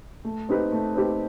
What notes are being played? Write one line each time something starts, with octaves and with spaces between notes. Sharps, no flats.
A3
C4 D#4 G4 B4
A3
C4 D#4 G4 B4